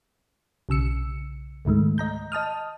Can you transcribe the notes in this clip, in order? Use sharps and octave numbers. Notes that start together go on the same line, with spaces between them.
B1 C#3 E6 C#7
C#2 G#2 D#3 G#3 A3
D#5 A#5 G6
D#5 A5 D#6 F6